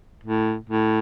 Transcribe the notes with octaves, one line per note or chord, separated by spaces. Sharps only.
A2
A2